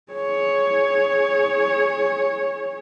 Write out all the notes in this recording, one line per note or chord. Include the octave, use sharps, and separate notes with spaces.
G#4 C#5